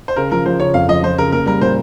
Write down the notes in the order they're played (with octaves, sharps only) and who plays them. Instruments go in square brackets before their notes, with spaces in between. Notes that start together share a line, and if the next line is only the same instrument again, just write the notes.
[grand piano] C5
[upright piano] C#3 [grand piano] A#4
[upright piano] F3 [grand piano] A#4
[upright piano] F3 [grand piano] C5
[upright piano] C#3 [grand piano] C#5
[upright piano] F2 [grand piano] F5
[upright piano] F3 [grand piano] D#5
[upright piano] F3 [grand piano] C5
[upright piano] C#3 [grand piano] A#4
[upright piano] A#3 [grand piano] A#4
[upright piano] G3 [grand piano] A#4
[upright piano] A#2 [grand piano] C5